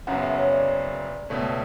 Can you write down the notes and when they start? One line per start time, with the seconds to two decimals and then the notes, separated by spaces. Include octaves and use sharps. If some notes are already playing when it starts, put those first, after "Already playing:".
0.07 F#1 F#2 C#3 F#3 B3 F#5
0.23 E5
0.38 C#5
0.53 D5
1.29 C#2 B2 A3 C#4